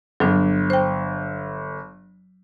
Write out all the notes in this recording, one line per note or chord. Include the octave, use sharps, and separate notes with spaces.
G1 F#3 D4
C5 G5